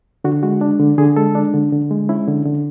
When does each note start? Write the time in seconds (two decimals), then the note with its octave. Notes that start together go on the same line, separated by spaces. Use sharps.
0.24 D3 F#4
0.43 G#3 F#4
0.61 D4
0.80 D3
0.98 D3 G#4
1.16 G#3 A4
1.35 D4
1.54 D3
1.72 D3
1.91 G#3
2.09 C#4 E4
2.28 D3
2.46 D3